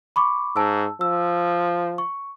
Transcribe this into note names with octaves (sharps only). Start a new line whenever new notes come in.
B5 C#6 D6
G#2 A5 E6
F3 E6
C#6